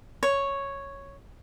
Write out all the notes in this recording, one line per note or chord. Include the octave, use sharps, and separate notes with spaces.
C#5